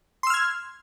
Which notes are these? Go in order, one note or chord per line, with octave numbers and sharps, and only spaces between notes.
C6 E6 F6 G#6